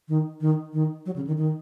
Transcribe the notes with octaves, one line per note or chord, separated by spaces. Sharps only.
D#3
D#3
D#3
F#3
C#3
D#3
D#3